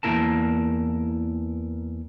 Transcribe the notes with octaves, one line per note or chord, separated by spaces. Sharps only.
E2 D3 A#3 E4 A#4 A5